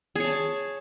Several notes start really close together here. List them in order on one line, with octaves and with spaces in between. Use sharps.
G#4 C#5 A5